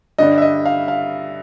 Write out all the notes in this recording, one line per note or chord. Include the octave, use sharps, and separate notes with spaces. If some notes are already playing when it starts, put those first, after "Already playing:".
G2 D3 G3 D#5
E5
D#5
F5
F5